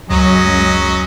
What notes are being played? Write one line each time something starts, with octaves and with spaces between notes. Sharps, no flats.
C#2 F#2 F#3 G#3 C#4 D#5